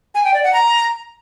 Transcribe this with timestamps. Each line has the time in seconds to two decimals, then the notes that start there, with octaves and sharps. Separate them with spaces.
0.15 G#5
0.24 G5
0.34 D5
0.44 F#5
0.53 A#5